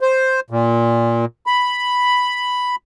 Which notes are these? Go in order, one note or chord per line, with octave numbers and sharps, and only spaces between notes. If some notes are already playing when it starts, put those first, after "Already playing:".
C5
A#2
B5